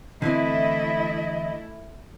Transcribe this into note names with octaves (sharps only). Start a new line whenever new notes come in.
D3 E3 A3 C4 E4 D#5